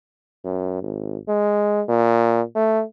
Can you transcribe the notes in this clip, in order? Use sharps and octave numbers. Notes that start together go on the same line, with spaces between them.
F#2
G#1
G#3
A#2
A3